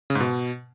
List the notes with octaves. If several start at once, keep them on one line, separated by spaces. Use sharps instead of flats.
C#3
G#2
B2